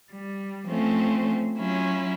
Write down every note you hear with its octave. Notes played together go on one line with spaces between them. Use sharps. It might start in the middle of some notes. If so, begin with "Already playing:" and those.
G3
F3 A3 C4 C#4
F#3 C#4 E4 F4